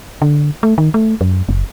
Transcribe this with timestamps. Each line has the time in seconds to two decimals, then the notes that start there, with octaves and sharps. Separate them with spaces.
0.22 D3
0.63 A3
0.78 D#3
0.94 A3
1.21 F#2
1.49 F#1